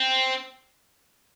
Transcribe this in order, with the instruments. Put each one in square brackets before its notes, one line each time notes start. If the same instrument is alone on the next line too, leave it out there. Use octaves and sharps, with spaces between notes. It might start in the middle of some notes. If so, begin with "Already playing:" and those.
Already playing: [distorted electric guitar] C4